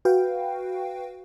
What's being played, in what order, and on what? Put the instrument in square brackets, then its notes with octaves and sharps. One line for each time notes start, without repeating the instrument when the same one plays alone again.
[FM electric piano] F#4 B4 F5 G5